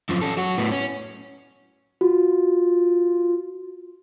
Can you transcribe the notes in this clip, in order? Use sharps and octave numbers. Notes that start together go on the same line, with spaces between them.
F#2 F3
C#4 A4
F#3 F#4
A2 B3
C#4
F4 F#4